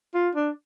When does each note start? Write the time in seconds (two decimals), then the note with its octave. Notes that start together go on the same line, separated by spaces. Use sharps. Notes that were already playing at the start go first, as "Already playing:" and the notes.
0.15 F4
0.35 D4